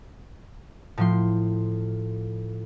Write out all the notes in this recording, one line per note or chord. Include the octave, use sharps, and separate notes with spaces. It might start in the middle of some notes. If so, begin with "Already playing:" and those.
A2 F3 C6